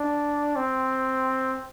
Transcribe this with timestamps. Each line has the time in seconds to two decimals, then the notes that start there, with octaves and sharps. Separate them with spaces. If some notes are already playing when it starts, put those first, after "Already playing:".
Already playing: D4
0.56 C4